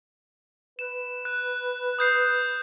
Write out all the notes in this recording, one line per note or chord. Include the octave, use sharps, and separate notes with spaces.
B4 E7
F#6
D#6 G6 C7